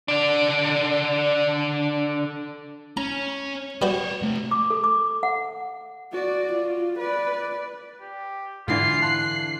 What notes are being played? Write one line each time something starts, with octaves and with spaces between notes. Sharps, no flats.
D3 D4
C#4 A#5
G3 B3 F#4 C5 C#5
C3 A3
D6
A4
D6
F#5
F#4 D5
F4
B4 D5
G4
G#2 D3 E3 D4 F4 C7
A5 C6 F#6